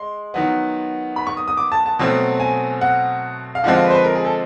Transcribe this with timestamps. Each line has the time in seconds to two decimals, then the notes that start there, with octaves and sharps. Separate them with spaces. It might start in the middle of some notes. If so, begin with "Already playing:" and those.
Already playing: G#3 C6
0.34 D#3 F#3 B3
1.16 B5
1.27 C#6
1.37 D#6
1.48 D#6
1.57 D6
1.72 A5
1.86 A5
1.99 B2 F#3 A3 C4
2.40 G#5
2.81 F#5
3.55 F5
3.64 D3 F3 G#3 C4 F#5
3.74 F5
3.84 B4
3.90 C5
3.95 B4
4.04 A#4
4.15 G#4
4.25 A4